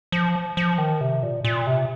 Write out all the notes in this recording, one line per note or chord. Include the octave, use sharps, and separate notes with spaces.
F3
F3
D#3
C3
A#2
A#2
C3